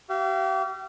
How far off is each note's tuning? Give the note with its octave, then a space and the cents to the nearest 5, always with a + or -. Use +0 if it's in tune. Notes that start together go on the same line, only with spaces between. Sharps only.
G4 -40 F5 -40